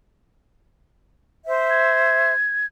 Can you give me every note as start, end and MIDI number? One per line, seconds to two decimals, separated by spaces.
1.46 2.33 72
1.46 2.33 76
1.70 2.66 92